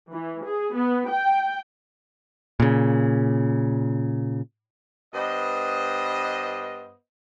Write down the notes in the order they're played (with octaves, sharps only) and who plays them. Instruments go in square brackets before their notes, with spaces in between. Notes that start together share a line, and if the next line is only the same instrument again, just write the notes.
[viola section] E3
G#4
B3
G5
[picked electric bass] A#2 C#3
[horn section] G2 B3 C5 D#5